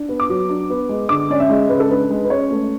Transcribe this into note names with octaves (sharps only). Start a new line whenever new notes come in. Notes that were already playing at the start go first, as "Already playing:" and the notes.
Already playing: D4
B3
D6
F#3
D4
B3
G#3
D3 D6
C#4 D5
E5
G#3
C#3 B4
A4
D4 B4
G#3
B4
C#4 C#5
A3